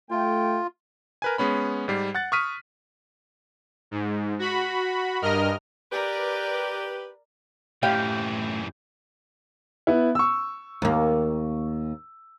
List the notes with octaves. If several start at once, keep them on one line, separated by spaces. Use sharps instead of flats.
A3 F4 G5
A#4 B4 G#5
G#3 B3 C#4 B5
G#2 G3 C7
F#5 F#6 A6
C#6 D#6 F6 B6 D#7
G#2
F#4 B5
G2 A#4 D#5 F6
G4 A#4 B4 D5
F#2 A2 E3 G4 F5 G5
B3 E4
C#6 E6
D#2 A#3